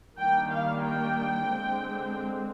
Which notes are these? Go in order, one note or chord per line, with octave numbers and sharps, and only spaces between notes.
D#3 G3 A#3 D4 G5
F5
G5
D3 G#3 C4